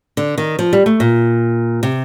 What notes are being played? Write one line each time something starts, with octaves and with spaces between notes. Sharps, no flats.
D3
D#3
F3
G3
A3
A#2
C3